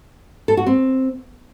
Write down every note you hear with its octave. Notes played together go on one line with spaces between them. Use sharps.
A4
F#4
C4